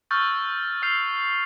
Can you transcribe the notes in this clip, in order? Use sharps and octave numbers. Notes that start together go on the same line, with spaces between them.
C#6 E6 F6 G6 A6
E6 F6 G6 C7 F7